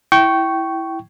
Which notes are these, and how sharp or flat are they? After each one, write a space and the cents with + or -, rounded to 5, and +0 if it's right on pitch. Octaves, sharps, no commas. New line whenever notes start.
E4 +0 G5 -20 C#6 +0